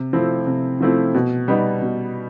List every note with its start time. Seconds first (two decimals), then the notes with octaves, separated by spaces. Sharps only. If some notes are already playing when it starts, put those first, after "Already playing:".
Already playing: C3
0.13 F3 A3 C4 E4
0.47 C3
0.80 F3 A3 C4 E4
1.14 B2
1.48 G3 B3 D#4
1.82 B2